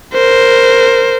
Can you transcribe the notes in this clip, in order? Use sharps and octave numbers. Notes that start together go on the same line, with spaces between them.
A#4 C5